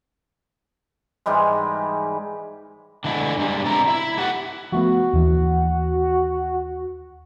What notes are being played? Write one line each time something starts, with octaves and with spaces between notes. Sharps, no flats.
G#2 E3 G3 G#3
D3 E3 G#3 A3 E4
G2 G3 G#3
C3 E3 G3 E4 A#5
E4 E5
A3 G4 F#5
F3 A3 B3 F#4
D#2 E3